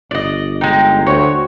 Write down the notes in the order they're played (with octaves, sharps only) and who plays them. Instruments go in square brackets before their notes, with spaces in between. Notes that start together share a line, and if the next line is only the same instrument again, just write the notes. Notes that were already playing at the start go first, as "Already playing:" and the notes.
[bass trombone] G1 [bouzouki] D5 D#5
[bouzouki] G#3 D#4 [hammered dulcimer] G5
[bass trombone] D2 [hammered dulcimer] F#4 C5 C#6 [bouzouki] C#5